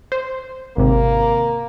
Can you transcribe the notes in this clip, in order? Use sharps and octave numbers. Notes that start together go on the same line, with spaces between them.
C5
G#1 C3 A#3